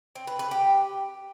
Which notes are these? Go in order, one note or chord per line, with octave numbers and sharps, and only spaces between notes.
C4
B4
B4
G4